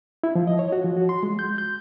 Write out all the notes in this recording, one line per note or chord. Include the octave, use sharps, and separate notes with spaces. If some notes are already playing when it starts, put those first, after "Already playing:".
E4
F3
D#5
C#5
F#4
F3
F#4
C6
G#3
G6
G6